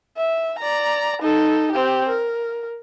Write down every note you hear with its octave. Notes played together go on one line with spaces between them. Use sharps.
E5
D5 A#5
D#4 A4
C4 G4
A#4